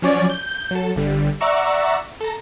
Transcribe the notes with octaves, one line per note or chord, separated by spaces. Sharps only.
F3 F#3 C#4 C#5 D5
G6
F#3 A4
G1 D3 G3
D5 E5 F#5 A#5 C#6 E6
A4 A#5